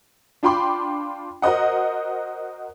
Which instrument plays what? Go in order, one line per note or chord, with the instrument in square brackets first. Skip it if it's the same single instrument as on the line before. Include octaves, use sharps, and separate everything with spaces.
[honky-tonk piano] D4 F4 G5 B5 C6 D6
F#4 A#4 C5 D#5 F#5